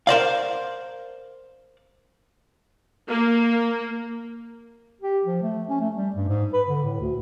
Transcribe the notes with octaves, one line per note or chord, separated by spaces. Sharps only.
A#4 C5 D5 F5
A#3
G4
F3
A3
C#4
A3
G3
G2
G#2
B4
D3
A2
D2